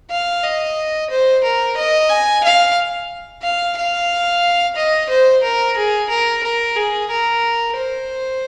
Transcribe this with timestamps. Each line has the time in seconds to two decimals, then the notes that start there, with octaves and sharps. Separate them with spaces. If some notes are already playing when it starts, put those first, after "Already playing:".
0.10 F5
0.44 D#5
1.10 C5
1.43 A#4
1.77 D#5
2.10 G#5
2.44 F5
3.43 F5
3.77 F5
4.76 D#5
5.09 C5
5.43 A#4
5.76 G#4
6.09 A#4
6.43 A#4
6.76 G#4
7.10 A#4
7.76 C5